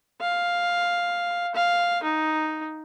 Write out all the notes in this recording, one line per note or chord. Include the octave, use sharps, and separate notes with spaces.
F5
F5
D#4